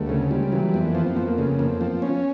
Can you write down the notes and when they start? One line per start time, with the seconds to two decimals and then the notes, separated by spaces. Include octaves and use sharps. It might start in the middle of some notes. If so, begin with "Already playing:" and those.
Already playing: D2 G3 G#3 A#3
0.09 C#3 A3
0.31 G3 G#3
0.52 E3 F#3
0.74 F2 B3
0.81 A#3
0.89 B3
0.95 F3
1.04 C4
1.15 F2 B3
1.26 A#3
1.38 C#3 A3
1.59 F2 A#3
1.80 F3 C4
2.02 B3 C#4